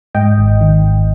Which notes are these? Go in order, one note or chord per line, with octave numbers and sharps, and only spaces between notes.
G#2 D#5 G5
G#1
D#3
G#1